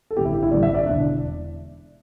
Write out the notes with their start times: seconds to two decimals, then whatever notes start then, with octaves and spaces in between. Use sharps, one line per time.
0.11 A4
0.17 A1 G2 D3 G3 B3 G4
0.25 E4
0.34 G4
0.43 E4
0.51 A1 G2 D3 G3 B3 D5
0.63 E5
0.74 D5
0.86 E1 E2 D3 D4